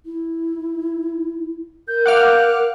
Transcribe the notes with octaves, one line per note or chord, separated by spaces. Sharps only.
E4
A#4 G6
F5 F#5 D6 F6 F#6